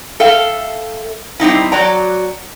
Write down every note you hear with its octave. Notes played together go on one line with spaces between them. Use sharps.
A4 E5 F5 G5
G3 C4 D#4 E4
F#3 F#4 D5 G5 A#5